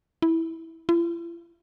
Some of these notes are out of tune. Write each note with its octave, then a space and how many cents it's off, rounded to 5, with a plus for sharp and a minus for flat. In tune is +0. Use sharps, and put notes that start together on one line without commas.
E4 -10
E4 +45